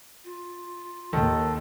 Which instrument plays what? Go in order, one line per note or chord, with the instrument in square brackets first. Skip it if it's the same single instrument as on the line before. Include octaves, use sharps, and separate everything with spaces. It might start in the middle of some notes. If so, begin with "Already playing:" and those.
[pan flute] F4
[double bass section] D#2 [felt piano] D#3 [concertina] A4